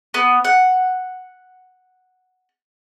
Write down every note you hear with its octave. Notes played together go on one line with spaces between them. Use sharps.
B3
F#5